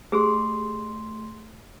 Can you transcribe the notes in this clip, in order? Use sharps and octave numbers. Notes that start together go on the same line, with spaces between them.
A3 G4 G#4 C6